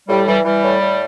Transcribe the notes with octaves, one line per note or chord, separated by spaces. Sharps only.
A2 G3
E3 G3
E3 G3
A2
A2